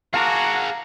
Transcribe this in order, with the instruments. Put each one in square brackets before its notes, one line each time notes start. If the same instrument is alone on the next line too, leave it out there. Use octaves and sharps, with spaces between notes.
[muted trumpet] F#4 [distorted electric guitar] G#4 A#4 [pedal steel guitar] F5 A5 D6 [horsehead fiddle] F#5 A#5